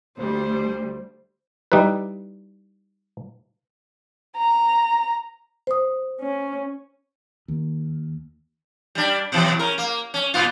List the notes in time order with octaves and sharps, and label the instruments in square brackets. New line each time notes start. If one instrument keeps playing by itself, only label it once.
[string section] D2 G3 [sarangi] C5
[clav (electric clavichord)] G3 D#4 E4 B4
[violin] A#5
[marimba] C5 D#6
[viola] C#4
[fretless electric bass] D#2
[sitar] G3 D4
B2 E3 F#3
C#4 A#4
A#3
C#4
A#2 B3 F4